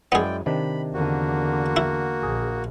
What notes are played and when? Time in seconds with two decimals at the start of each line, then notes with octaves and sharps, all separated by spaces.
0.12 F#2 G#3 B3 E4 G#4 D5 G5
0.46 C3 D#3 D4 B5
0.93 E2 D3 A#3 F#4
1.77 E4
2.23 A#1 G#4